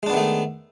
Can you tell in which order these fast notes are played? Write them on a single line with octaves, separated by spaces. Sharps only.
G#3 D4 B3 D#3 A3